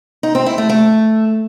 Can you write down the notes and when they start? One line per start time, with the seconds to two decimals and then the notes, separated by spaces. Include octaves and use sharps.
0.23 D#4
0.35 C4
0.46 E4
0.58 A3
0.69 A3